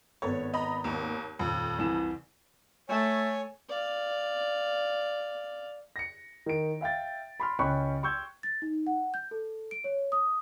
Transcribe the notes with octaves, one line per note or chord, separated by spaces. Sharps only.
G#1 B3 A4 C#5
D#5 A#5 B5
D#2
D#1 F2
C2 E3 E7
A3 C#5 G#5
D5 F5
A#6 C#7
D#3 D7
E5 F5 G5 A6
B5 C6 F6
C#2 C#4 G5 B5 C#6 F#6
G5 C6 C#6 E6 G6 G#6
A6
D#4
F#5
G6
A4
D7
C#5
D#6